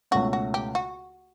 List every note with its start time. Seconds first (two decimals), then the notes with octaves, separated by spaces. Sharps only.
0.11 C#2 B2 A3 C#4 F#4
0.33 F#4
0.54 G4
0.75 F#4